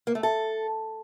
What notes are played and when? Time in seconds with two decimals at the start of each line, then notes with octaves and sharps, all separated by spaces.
0.07 A#3
0.15 A3
0.23 A4